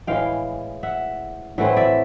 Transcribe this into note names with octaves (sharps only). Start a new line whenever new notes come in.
A2 E3 G#3 F5 G5
E5 F#5
A2 E3 A3 C4 E5 F#5
D5 E5